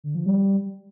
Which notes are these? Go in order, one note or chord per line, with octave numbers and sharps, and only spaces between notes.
D3
F3
G3